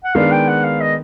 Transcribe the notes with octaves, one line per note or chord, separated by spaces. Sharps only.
F#5
D#3 G#3 B3 D4 F5
G5
F#5
F5
D#5